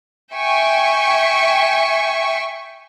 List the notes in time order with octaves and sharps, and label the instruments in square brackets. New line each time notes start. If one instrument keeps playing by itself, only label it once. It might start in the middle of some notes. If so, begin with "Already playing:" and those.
[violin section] E5 G5 G#5 C#6